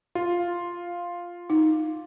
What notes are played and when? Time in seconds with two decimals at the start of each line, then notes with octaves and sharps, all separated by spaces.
0.15 F4
1.50 D#4